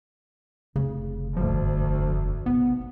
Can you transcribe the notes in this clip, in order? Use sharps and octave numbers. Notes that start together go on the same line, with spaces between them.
F1 C#3
G#1 D2 G2 F3
B1 C3 B3